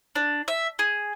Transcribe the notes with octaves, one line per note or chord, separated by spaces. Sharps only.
D4
E5
G#4